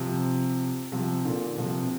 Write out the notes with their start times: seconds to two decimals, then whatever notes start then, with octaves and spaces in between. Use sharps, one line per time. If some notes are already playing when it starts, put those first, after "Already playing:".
Already playing: C3 F3
0.92 C3 F3
1.25 A#2 D3
1.58 C3 F3
1.83 C3